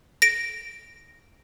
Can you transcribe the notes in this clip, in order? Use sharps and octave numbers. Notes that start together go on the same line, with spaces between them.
A#6 D7